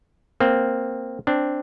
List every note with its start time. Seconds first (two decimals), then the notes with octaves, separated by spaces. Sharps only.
0.40 A#3 C4
1.27 C4 D4